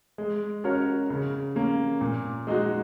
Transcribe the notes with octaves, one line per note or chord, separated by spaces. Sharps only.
G#3
C#4 F#4 A#4 C#5
C#3
A#3 C#4
A#2
G#3 D#4 F#4